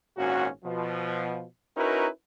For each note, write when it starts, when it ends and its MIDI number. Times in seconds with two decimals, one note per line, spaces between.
0.17 0.47 32
0.17 0.47 46
0.17 0.47 61
0.17 0.47 66
0.65 1.43 47
0.65 1.43 53
1.77 2.07 61
1.77 2.07 63
1.77 2.07 64
1.77 2.07 66
1.77 2.07 70
1.77 2.07 71